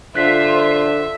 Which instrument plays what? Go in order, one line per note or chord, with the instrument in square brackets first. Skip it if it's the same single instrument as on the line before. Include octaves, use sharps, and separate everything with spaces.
[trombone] D3 [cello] F4 C5 [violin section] E5 [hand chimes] F#6 B6